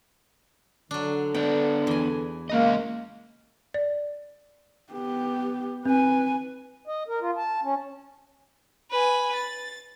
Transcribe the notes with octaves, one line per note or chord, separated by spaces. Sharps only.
D3 F#3 D4
B3 D4 G5
E2 G#5
G#3 A#3 C#4 D#5
D5
B3 G4
C4 B4 G#5
D#5
A#4
F4
A5
C#4
B4 G#5
A6